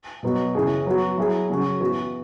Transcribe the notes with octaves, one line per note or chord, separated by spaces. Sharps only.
B2 F#3 B3 F#4
C#3 E3 C#4 G#4
F#3 B3 F#4
F#3 E4 G#4
C#3 F#3 C#4 F#4
E3 B3 F#4